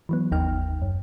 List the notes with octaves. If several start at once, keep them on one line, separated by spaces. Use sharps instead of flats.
E3 F#3 B3
G1 D#2 D#4 G5 F6
F#2